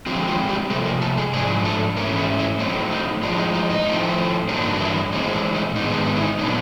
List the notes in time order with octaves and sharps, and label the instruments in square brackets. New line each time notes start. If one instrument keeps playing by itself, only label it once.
[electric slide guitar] D3 F3 F#3 G#3 C4 F#4
F3 F4
G3 G4
C3 F3 A3 A#3 A4
A#3 A#4
A3 A4
G#3 G#4
G#2 F3 G#3 D4 G#4
A3 A4
G#2 E3 A3 A#3 C#4 A#4
E3 E4
E3 E4
A2 F#3 A3 C4 D#4
D#4
A2 F3 G#3 D4
D#4
D#4
D#4
A2 F3 A3 C4
G2 D3 F#3 A#3 D4 D#4
E3 E4
A2 E3 G#3 C4 D#4
D4
D#4
G#2 D#3 G#3 B3 D#4
D4
D#4
E4
D#4
A#2 F#3 B3 D4 D#4